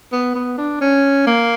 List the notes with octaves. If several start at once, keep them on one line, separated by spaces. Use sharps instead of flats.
B3
B3
D4
C#4
A#3